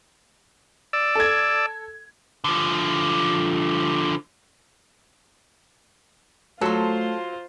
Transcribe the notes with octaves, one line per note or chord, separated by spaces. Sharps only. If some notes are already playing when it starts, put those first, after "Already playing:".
D5 E6
A4 G#6
D3 F3
F#3 A3 F4 A4 C5 C6